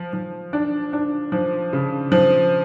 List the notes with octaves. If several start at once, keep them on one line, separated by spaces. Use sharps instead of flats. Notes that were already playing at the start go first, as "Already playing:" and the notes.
Already playing: F3
F3
D4
D4
F3
C#3
F3